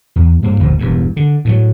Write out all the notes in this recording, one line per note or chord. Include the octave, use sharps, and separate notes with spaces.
E2
G2 A#3
F#1 D2 A#2 F3
E1 E2 G2
D3
A2 D#3 F#3